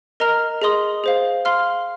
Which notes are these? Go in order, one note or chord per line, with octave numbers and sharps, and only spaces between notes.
A#4 D#5 A#5 F6
G#4 D#5 C6 D#6
G#4 C5 F5
F5 C6 F6